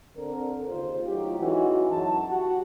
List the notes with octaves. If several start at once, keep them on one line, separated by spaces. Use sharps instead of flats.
D3 C4 A#4
D#2 C#3 F4 C5
A2 F#3 D#4 F4 G4
E3 G#3 C#4 D#4 F#4
F#2 F#3 E4 A5
F#4 G4 F#5